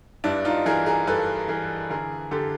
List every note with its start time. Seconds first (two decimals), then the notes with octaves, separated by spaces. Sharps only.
0.24 G2 D4 E4
0.45 D#4 F4
0.66 E3 G#4 A#4
0.86 G#4 A#4
1.07 G2 A4 B4
1.48 E3 G#4 A#4
1.90 D3 G#4 A#4
2.31 D3 G4 A4